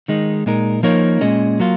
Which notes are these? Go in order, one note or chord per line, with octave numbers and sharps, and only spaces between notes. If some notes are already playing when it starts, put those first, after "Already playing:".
D#3 G#3 D#4
A#2 G#3 D#4 A#4
F3 A#3 D#4 A#4 C#5
A#2 G#3 C#4 G#4 D#5
F#3 A#3 F4